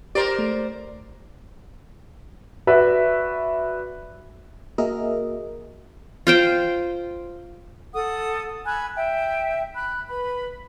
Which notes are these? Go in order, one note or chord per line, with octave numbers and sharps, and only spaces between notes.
G4 A#4 C5 D5
A3
F#4 B4 D5 E5
A#3 F#4 G#4 A#4 D#5 E5
F4 C5 G5
A4 F#5 D#6
G#5 B5 E6 F#6
E5 G5
B5 F#6
B4 B5